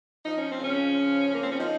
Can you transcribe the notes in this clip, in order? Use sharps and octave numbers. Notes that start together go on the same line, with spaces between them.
F3 D#4
C#4
C4
C#3
C#4
F3
C#3
A#3
C4
C#4
F3 D#4